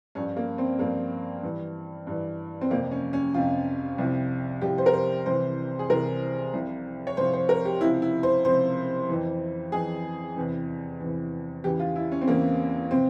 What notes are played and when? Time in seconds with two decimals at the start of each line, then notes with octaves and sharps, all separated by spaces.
0.15 G2 F3 C#4
0.37 A#3
0.58 C4
0.79 G2 F3 A#3
1.43 G2 E3
2.07 G2 E3
2.61 C4
2.71 F2 C3 F3 A#3
2.91 C#4
3.13 C#4
3.34 F2 C3 F3 F4
3.98 C2 C3 F3
4.61 C2 C3 F3 G4
4.78 C5
4.86 A#4
4.94 C5
5.26 C2 C3 E3 C5
5.79 G#4
5.90 C2 C3 E3 A#4
6.54 C2 C3 F3
7.07 C#5
7.17 C2 C3 F3 C5
7.33 C5
7.49 A#4
7.65 G4
7.81 C#2 C3 F3 E4
8.02 E4
8.23 C5
8.45 C#2 C3 F3 C5
9.09 F2 E3
9.72 F2 E3 G#4
10.36 E2 C3 E3
11.00 E2 C3 E3
11.64 E2 C#3 E3 G4
11.79 F4
11.96 E4
12.12 C#4
12.22 C4
12.28 E2 C#3 E3 A#3
12.91 C3 F3 C4